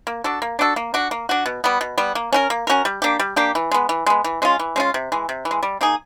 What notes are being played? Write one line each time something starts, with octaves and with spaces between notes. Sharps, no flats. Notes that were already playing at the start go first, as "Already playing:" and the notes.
A#3
D4 F#4 A4
A#3
D4 F#4 A4
A#3
D4 F#4
A#3
D4 F#4
B2
G3 B3
B2
G3 B3
A#3
C#4 F#4 A#4
A#3
C#4 F#4 A#4
G3
A#3 D4 G4
G3
A#3 D4 G4
E3
G#3 B3
E3
G#3 B3
E3
G#3 C#4 F4
E3
G#3 C#4 F4
C3
E3 G#3
C3
E3
G#3
G3
A#3 D#4 G#4